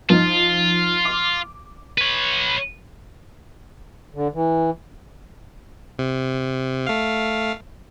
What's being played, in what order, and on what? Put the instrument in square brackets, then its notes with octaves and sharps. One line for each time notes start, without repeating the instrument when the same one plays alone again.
[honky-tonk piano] F3 D#4 [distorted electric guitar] F4
[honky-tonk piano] D6
[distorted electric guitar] B4 C#5
[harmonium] D3
E3
[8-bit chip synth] C3
A3 F5